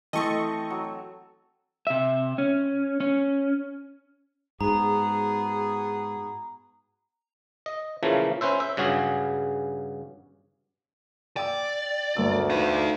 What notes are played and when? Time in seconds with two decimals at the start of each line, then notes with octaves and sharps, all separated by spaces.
0.13 E3 A3 C4 A4 D#5 C#6
0.70 F#3
1.87 C3 E5
2.38 C#4
3.00 C#4
4.61 G#2 B3 F#4 G#4 A#5
7.66 D#5
8.03 C#3 E3 F3 A3 A#3
8.41 C#4 B4 C5 E5
8.60 E5
8.77 G2 C#3 F#4 G#4
11.37 D5 G5 E6
12.17 G1 D2 A#4 E6
12.50 D#4 F4 B4 F5